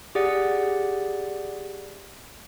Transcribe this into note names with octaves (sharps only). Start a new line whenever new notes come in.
G4 G#4 D5 F#5